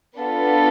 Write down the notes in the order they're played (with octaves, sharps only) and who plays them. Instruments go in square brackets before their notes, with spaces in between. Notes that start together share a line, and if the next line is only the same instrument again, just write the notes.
[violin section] B3 D4 F4 A4